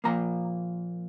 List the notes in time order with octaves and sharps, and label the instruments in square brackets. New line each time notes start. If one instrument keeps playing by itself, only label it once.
[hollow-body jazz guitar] A#2 F3 A#3 A#5